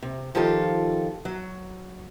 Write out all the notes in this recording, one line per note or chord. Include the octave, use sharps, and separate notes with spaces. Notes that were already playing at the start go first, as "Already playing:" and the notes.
C3
D#3 F3 F4 G4 A4
F#3